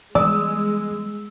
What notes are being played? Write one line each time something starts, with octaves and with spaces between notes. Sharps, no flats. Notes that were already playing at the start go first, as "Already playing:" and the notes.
E3 G3 G#3 B3 D5 D#6 E6